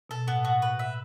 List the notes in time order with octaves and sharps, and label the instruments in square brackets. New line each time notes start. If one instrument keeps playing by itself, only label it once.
[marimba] B2 [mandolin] A4
[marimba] A2 [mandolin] B3
[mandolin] F#4
B4
E5